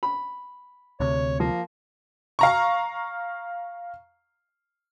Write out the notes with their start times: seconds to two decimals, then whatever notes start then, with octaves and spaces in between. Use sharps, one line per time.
0.03 B5
1.00 D2 C3 C#5
1.40 F3 A#3
2.39 F5 A#5 C#6